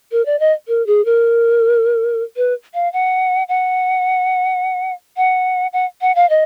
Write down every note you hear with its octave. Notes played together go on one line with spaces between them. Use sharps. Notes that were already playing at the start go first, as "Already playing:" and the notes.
A#4
D5
D#5
A#4
G#4
A#4
B4
F5
F#5
F#5
F#5
F#5
F#5
F5
D#5